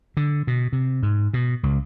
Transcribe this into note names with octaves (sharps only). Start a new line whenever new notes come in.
D3
B2
C3
G#2
B2
C#2